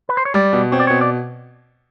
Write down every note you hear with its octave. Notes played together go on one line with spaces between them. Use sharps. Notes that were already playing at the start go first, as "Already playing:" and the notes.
B4
C5
C#5
G3 D5
B2
C4 C#5
D5
B2 C#5
D5